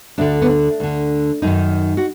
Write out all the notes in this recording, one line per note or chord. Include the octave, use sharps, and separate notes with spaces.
D2 D3 D4
B3
D4
D2 D3
F#2 D#3 D#4
F#4